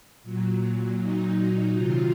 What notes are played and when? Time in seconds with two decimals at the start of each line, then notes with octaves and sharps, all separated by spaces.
0.23 A#2 F#3
0.98 A#2 F#3 D#4
1.74 C3 D#3 F#3 F4